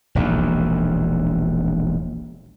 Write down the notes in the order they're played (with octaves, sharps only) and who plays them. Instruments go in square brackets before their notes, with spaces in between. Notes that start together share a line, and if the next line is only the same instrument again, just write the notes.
[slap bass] E1 A#1 D#2